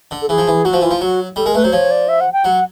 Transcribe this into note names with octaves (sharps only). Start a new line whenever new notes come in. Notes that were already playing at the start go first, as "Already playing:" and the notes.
D3
A4
E3 G#4
F3
E3
F#3 F#4
F3
E3 F4
F3
F#3 F#4
G3 A4
G#3 A#4
A3 B4
F#3 C5
F3 C#5
D5
E5
F#5
G5
F#3 F#5